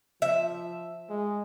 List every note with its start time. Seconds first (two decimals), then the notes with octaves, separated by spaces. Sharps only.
0.22 F3 E5
1.10 G#3